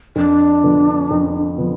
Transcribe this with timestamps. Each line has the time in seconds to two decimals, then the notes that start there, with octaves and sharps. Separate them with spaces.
0.16 F2 D4
0.63 D3 F3 B3
1.11 F2
1.58 D3 F3 B3